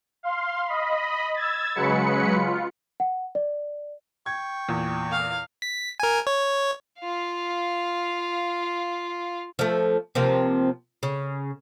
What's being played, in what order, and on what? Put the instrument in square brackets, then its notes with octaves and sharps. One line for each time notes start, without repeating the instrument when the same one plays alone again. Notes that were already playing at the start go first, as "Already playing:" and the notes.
[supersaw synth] F5 C6
D#5 B5
E6 G#6 A6
C#3 F#3 G#3 B4 B5 C#7
F4
[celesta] F#5
D5
[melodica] G5 C#6 [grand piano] G#6
[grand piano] E2 [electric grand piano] A#2
[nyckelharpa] F5
[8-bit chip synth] B6
A#4 G#5
C#5
[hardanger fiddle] F4 F5
[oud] F3 A3
C3 F3 A#3
C#3